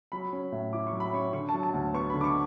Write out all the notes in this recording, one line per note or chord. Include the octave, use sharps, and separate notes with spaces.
F#3 B5
C#4
A2
E4 D6
C#6
F#3
B5
C#4 C#6
D3 C#6
A5
F#3
A5
D2
B3 C#6
B5
D3
D6
C#6